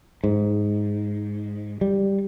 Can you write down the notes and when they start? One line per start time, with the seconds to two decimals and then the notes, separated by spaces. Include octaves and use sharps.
0.24 G#2
1.81 G3